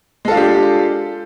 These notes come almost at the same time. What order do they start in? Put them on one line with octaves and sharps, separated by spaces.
G#3 A4 F4 D4 G4